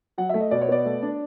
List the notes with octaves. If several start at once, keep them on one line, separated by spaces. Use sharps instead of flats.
F#3 F#5
E5
A3
D#5
B2 D5
C#5
B3 D5
A3
D4